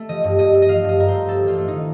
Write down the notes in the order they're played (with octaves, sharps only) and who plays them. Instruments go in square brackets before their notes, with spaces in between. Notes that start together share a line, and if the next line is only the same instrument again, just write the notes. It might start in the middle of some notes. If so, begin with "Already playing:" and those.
Already playing: [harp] A3
F3 D#5
G2
G2 D#5
A3
D#5
F3 F5
G2
D#5
G2 A#4
C5
A3
G2 A4
A1
F4
A3
D#4
D#3